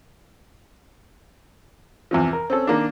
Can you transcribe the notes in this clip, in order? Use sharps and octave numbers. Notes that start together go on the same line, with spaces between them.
E2 C3 F3
A#4
C4 C#4 A4
D#3 A#3 D4